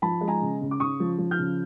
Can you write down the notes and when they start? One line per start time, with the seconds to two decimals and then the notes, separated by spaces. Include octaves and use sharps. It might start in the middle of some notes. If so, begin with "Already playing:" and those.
0.02 F3 A5 B5
0.21 G#3
0.28 G#5 A#5
0.42 C#3
0.61 C#3
0.71 D6
0.80 C#3 C#6 D#6
1.00 F3
1.18 F3
1.31 F6 G6
1.39 C#3